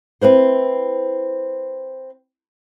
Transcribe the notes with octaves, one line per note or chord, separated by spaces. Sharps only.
C4 E4 B4 C5